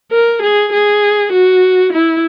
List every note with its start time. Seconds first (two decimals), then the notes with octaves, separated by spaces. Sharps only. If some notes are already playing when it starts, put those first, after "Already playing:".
0.12 A#4
0.42 G#4
0.73 G#4
1.32 F#4
1.92 E4